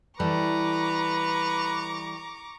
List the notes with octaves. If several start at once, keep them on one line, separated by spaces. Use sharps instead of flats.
E3 G3 A4 B4 A#5 C#6 D6